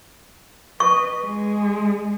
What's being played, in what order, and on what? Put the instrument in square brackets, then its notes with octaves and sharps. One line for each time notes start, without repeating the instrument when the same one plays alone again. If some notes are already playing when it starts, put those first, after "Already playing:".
[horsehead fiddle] B4 D#5 [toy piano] C#6
[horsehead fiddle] G#3